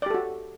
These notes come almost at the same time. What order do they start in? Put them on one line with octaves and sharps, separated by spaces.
D5 G4 A4 F#4